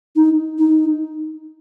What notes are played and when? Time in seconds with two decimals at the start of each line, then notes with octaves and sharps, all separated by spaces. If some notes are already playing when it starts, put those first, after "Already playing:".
0.16 D#4
0.59 D#4